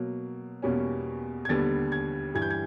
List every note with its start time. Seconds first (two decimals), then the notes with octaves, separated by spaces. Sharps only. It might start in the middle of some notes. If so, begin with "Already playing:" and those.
Already playing: B2 F#3 A#3
0.62 E2 B2 G3 A#3 C#4
1.45 G#6
1.49 D#2 D3 G3 B3 A6
1.92 G#6
2.34 G2 E3 G3 G#6
2.42 G6
2.51 G#6